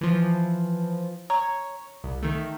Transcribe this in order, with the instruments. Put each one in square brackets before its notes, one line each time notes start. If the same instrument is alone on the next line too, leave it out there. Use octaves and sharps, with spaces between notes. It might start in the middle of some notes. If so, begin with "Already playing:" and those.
[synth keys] E3 F3
[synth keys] C#5 [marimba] A#5
[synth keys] C2
D#3 A3